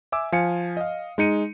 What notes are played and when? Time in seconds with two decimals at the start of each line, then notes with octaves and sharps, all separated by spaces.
0.12 E5 G#5 D6 E6
0.32 F3 F5 G#5 C#7
0.77 D#5 F5
1.18 G#3 D#4 C#7 D#7